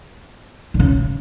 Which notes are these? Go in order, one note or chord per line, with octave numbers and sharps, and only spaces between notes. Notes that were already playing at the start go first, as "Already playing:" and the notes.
D3
C#3